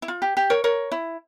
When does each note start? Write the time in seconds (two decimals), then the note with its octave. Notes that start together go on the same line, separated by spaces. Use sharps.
0.02 E4
0.08 F4
0.22 G4
0.37 G4
0.50 A#4 C#5
0.64 A#4 C#5
0.92 E4